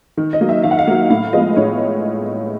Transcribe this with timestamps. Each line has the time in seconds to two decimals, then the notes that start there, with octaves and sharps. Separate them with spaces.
0.17 D#3
0.33 D#5
0.41 F#3 A#3
0.49 E5
0.64 D#3 F5
0.71 F#5
0.79 F5
0.87 F#3 A#3
1.10 A2 F5
1.33 F3 G#3 B3 D#5
1.56 A2 C#5